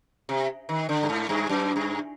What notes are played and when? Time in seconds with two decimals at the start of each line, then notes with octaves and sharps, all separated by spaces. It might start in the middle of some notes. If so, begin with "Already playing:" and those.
0.29 C3
0.69 D#3
0.89 D3
1.03 G2
1.09 G#2
1.29 G2
1.49 F#2
1.76 G2